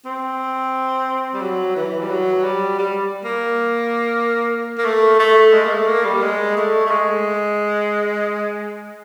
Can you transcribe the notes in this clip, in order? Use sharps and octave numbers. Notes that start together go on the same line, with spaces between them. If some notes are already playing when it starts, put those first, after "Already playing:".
C4
G3
F#3
E3
G3
F#3
G3
G3
A#3
A#3
A3
A3
G#3
A#3
A3
A#3
G3
G#3
A3
A3
G#3